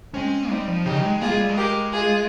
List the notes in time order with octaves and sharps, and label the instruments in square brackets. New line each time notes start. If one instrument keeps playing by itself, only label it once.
[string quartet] G#3 C4 [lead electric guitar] C#4
[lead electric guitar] G3 [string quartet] C4 D#4
[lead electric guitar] F3
[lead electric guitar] C#3 [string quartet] D#4 G4
[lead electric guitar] G#3
[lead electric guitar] A#3 [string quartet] F4 G#4
[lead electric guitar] G#3
G3
G#3
[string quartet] G4 A#4
F4 G#4